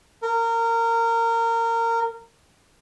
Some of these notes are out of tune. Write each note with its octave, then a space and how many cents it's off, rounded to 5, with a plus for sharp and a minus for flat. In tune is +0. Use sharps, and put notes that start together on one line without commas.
A#4 -20